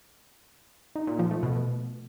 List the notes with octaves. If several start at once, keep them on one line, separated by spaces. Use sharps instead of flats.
D#4
A#2
F3
A3
B2